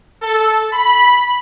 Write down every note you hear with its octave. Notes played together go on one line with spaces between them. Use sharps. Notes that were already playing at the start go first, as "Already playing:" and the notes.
A4
B5